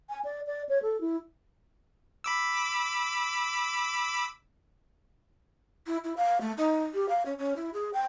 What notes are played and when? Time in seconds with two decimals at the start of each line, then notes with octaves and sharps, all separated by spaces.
0.10 G#5
0.25 D5
0.47 D5
0.69 C#5
0.82 A4
1.01 E4
2.24 B5 D6 E6
5.87 E4
6.04 E4
6.17 F5
6.41 A3
6.57 D#4
6.94 G4
7.09 F5
7.26 C#4
7.39 C#4
7.56 E4
7.74 G#4
7.94 G5